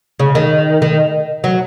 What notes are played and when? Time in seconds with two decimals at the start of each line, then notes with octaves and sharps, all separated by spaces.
0.20 C#3
0.35 D#3
0.82 D#3
1.44 F#3